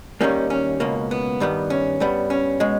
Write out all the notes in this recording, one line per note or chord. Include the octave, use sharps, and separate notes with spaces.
D#2 D#3 G3 A#3 C#4
C#4
C#2 B2 A#3
B3
G2 D#3 G3 B3
C#4
G2 G3 B3
C#4
B2 G#3